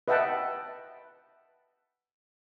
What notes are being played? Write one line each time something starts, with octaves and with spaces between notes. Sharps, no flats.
B4 D#5 E5 F#5 G5 A5